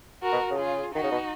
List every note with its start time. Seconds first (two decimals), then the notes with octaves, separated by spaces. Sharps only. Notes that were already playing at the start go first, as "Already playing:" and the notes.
0.23 F#4 A#4
0.32 B2
0.51 C#3
0.58 F4 G#4
0.94 D#3 D#4 F#4
1.04 C#3
1.12 B2